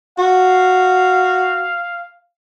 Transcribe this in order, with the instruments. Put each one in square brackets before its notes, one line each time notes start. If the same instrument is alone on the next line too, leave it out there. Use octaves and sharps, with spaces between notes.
[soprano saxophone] F#4 [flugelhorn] F5